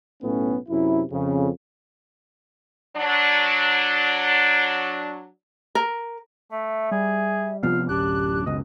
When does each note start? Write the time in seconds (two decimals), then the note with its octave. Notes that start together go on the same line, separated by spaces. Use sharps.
0.23 B1 A2 B3 C#4
0.69 F#2 C3 E4
1.12 F2 C#3
2.97 F#3 D4
5.75 A#4
6.51 A3 E5
6.91 G3 G#4
7.63 C3 F3 B3 F4 F5
7.89 D1 F#2 D4 G4 F#6
8.46 F#1 C#2 B2 D#5